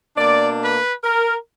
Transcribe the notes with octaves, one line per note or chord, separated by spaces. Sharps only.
B2 A#3 D4 D5
B4
A#4